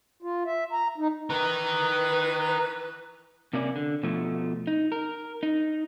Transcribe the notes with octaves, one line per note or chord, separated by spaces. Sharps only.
F4
E5
A#5
D#4
E3 D#4 A#4 B4
C3 A#3 C#4 D5
D3
B2 F3 A3
D#4
A#4
D#4